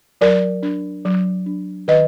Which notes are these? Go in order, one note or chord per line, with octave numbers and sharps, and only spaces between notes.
F#3 A#4 D5
D4
F#3
D4
D#3 B4 D#5